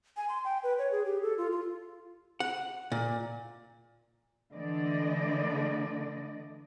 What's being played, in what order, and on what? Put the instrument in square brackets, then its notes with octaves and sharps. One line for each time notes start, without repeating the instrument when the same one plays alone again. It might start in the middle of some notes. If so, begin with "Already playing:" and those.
[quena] G#5
C6
G5
B4
C#5
G#4
G4
A4
F4
F4
[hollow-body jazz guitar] F#5
A#2
[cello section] D3 E3 A3 D5 D#5